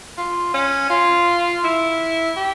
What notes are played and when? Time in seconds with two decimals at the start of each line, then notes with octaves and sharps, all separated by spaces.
0.18 F4
0.54 C#4
0.90 F4
1.64 E4
2.36 G4